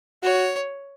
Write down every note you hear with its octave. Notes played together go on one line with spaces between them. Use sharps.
F#4 C#5